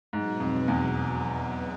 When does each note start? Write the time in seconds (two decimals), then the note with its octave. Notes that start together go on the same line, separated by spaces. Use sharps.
0.12 G#2 B2 F#3 B3
0.40 F2
0.68 E2